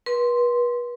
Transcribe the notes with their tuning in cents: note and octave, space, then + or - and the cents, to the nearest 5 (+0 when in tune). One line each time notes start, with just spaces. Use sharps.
B4 -35 C6 +0